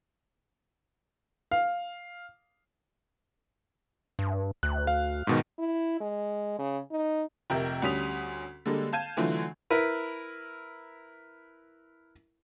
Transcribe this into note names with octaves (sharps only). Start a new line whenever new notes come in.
F5
G2
D2 F#6
F5
G#2 B2 D#3
E4
G#3
C#3
D#4
F1 G4 A#4 E5 G6
D2 G3 C#4 D#6 B6 F7
D3 G3 G#3 A#3 A4
F5 A5 G6 G#6 D#7
D3 E3 F#3 A3 F4
E4 A#4 B4